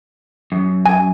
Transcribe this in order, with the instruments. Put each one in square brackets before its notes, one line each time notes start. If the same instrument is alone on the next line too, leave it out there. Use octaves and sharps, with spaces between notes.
[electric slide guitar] F#2
[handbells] G#5